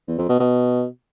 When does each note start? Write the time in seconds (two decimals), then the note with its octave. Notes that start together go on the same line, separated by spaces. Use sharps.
0.07 E2
0.18 F2
0.29 B2
0.39 B2